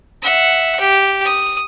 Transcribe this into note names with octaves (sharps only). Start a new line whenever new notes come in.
E5 F#5
G4
D#6